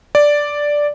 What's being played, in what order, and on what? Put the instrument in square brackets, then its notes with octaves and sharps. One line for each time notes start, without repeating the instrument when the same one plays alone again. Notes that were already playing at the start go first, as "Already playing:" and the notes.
[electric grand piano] D5